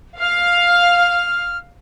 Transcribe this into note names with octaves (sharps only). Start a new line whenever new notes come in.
F5 F6